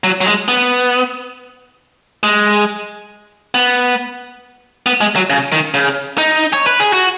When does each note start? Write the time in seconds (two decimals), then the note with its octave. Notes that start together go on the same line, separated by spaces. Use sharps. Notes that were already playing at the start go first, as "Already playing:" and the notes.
0.04 F#3
0.21 F#3
0.26 G#3
0.48 B3
2.23 G#3
3.55 B3
4.86 B3
5.01 G#3
5.16 F#3
5.30 C#3
5.52 D#3
5.74 C#3
6.18 D#4
6.53 C#5
6.67 B4
6.80 G#4
6.93 F#4